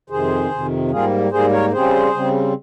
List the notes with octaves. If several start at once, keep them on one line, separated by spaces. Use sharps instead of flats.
F2 C3 D#3 G#4 C5
F2 C3 D#3
G#2 G3 A#3 F4 G#4
G#2 G3 A#3 G#4 C5
A#4 C#5
C#3 G3 C4 G#4 C5
C#3 G3 C4